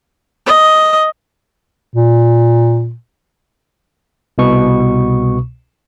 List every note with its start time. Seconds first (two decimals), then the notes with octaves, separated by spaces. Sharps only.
0.46 D#5
1.94 A#2
4.38 C2 B2 C#6